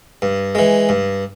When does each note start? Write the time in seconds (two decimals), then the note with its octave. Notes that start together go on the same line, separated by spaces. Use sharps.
0.22 G2
0.55 E3 G#3
0.89 G2